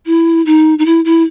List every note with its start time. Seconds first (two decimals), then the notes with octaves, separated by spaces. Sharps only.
0.06 E4
0.45 D#4
0.78 D#4
0.85 E4
1.04 E4